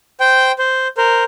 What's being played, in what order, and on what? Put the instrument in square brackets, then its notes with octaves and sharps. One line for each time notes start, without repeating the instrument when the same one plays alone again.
[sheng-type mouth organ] C5 G5
C5
A#4 C5